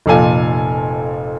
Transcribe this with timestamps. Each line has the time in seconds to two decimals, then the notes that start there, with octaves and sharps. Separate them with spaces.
0.06 F1 F2 A#2 A4 F5 G#5